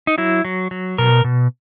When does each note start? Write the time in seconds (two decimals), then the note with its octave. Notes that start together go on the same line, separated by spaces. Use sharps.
0.07 D#4
0.18 F#3 E4
0.45 F#3
0.71 F#3
0.98 B2 A#4
1.24 B2